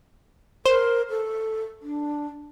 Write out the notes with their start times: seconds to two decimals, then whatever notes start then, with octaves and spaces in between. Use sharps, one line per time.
0.66 A#4 C5
1.10 A4
1.82 D4